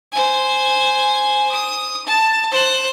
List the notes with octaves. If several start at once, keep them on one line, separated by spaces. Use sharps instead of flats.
C5 G#5
D#6
A5
C5 F#6